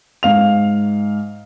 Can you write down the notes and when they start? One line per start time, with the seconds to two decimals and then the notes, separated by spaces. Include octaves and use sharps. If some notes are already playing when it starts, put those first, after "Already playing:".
0.23 G#2 F5 F7